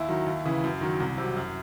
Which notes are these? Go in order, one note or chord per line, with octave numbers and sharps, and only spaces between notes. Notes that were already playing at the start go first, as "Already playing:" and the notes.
Already playing: D#2 E4
D#3 F#3
D#2
C#3 E3
F#2
D#3 F#3
C2
C3 F#3
F#2